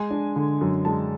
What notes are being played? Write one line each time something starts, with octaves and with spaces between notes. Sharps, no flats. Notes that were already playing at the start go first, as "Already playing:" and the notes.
Already playing: G#3 G#5
D4
D3
F#2
G#3 A5